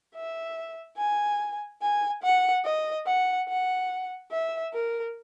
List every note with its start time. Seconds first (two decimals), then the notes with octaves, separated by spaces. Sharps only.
0.15 E5
0.97 G#5
1.82 G#5
2.23 F#5
2.65 D#5
3.06 F#5
3.48 F#5
4.31 E5
4.73 A#4